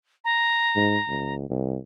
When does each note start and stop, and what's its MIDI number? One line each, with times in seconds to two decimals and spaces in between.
0.25 1.35 82
0.76 0.96 44
1.08 1.48 37
1.50 1.76 36